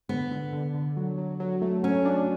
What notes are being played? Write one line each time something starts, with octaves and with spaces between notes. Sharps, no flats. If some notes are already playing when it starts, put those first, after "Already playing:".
D3 B3
D3
D3
D3
F#3
F#3
F#3
A3
F#3 C#4
D4